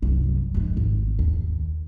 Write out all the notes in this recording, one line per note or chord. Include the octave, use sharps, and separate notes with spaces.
C2 F#2
F2 G#2
G#1
D#2